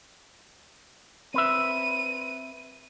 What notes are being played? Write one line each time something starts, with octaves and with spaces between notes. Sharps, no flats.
C4 B4 E5 D#7